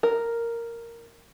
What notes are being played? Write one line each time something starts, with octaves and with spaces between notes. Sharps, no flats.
A#4